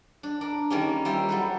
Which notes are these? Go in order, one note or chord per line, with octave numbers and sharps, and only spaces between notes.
D4
D4 A#4
D#3 G3 A#3 C#4
G3 E4 F4 C5
F#3 A4 B4